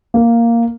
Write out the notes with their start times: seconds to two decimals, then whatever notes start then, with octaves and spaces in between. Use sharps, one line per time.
0.14 A#3